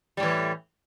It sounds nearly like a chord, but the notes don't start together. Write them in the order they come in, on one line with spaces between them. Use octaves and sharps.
G3 A2 E3